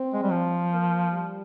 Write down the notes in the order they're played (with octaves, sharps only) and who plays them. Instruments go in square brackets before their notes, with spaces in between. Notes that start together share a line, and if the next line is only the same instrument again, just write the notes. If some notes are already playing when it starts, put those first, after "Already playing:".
Already playing: [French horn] C4
[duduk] G#3
G3
F3
[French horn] A#3
G3